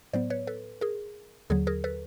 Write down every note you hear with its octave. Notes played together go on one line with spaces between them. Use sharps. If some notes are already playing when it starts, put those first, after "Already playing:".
A2 F#3 B3 C5 D5
B4 C#5
A4 B4
G#4 A#4
D#2 D3 F#3 G#4
G#4 A#4
A4 B4